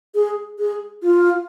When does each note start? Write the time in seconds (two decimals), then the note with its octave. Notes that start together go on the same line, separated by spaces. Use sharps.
0.15 G#4
0.59 G#4
1.03 F4